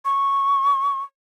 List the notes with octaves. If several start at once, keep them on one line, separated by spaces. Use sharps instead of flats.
C#6